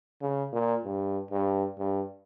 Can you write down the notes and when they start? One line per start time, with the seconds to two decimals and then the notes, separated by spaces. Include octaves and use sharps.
0.22 C#3
0.53 A#2
0.85 G2
1.31 G2
1.79 G2